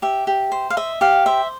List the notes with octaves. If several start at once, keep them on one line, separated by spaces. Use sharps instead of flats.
G4 E5
G4
C5
F5
D#5 E5
G4 F5
C5 E5